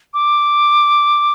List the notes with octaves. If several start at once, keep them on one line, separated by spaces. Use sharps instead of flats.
D6